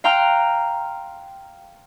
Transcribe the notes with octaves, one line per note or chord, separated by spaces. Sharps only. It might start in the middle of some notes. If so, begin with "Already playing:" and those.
F5 G5 A#5 C6 F6 F#6